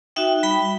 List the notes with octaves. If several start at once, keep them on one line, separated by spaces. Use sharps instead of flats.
D#4 F#4 E5 G5
G3 G5 B5